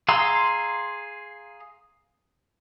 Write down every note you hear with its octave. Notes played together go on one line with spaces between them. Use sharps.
G#4 F5 A#5 C6 E6